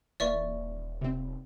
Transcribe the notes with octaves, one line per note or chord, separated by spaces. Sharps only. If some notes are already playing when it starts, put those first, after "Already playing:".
D#1 E3 A#3 D5 E5 C#6
C3 C4